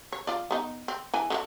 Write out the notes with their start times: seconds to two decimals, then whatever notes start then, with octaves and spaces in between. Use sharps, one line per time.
0.12 C#5
0.27 F4 D5
0.51 B3 D#4
0.88 C4
1.14 E3 G#5
1.30 D3 D#4 F#4